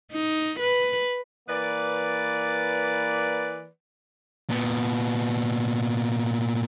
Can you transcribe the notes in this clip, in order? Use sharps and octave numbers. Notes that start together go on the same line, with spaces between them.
D#4
B4
E3 A#3 B4 D5
A#2 B3